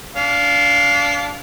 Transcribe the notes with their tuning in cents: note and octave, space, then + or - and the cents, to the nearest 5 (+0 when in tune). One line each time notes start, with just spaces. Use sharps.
D4 -30 F5 +0